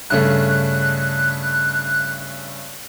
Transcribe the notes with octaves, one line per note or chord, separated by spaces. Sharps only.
G2 C#3 A3 F#6